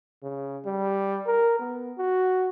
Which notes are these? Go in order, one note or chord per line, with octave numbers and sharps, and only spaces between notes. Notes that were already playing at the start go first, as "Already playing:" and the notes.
C#3
G3
A#4
B3
F#4